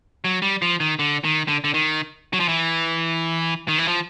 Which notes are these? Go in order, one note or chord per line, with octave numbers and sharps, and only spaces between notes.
F#3
G3
F3
D#3
D3
D#3
D3
D3
D#3
F#3
F3
E3
D#3
E3
F3